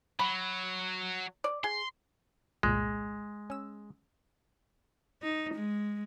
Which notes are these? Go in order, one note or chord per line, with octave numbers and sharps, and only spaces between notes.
F#3 B5
D5
G#4 C6
G1 C2 A#2 G#3
C#4 E6
D#4
G#3